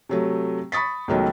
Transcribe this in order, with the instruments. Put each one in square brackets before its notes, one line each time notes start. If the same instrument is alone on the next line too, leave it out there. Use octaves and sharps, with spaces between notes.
[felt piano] C3 F#3 A3
B5 C#6 D#6 A6 B6
C#2 B2 D#3 F#3 A3